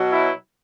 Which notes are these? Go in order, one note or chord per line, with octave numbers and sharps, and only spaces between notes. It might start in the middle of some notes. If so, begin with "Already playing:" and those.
Already playing: B2 F#3
E4